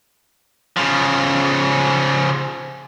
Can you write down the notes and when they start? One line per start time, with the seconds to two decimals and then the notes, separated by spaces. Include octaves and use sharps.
0.77 C#3 F3